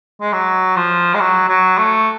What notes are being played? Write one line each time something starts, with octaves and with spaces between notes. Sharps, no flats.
G#3
F#3
F3
G#3
F#3
F#3
A3